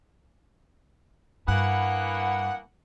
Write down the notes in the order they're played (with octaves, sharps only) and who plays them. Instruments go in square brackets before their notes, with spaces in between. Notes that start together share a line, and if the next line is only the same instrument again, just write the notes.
[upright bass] G2 [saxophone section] E3 A#3 B3 [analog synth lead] F#5